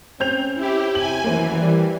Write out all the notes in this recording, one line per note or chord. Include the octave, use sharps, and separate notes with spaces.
C4 C#4 G6 F7
E4 G4
C3 G#5 F#7
F#2 E3 A#3 C5
G3